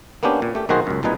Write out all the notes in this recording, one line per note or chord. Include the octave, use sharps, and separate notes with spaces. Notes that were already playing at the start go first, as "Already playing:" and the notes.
A#3 B3 C#4 D4 G4
A#2
A3 G4
B1 D#3 A#3 F#4 G#4 C5
C#2 F#2
C2 A#2 G#3 D#4 B4 G#5